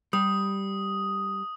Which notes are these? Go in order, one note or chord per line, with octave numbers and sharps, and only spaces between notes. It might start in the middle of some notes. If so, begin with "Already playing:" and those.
G3 D#6